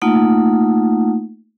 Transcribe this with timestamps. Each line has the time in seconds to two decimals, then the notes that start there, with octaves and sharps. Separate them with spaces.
0.02 A3 A#3 D#4 F4 F#5